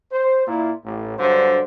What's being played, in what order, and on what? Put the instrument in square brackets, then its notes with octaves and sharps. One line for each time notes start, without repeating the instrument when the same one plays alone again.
[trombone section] C5
A#2 E4
A1
G2 D3 F#3 C5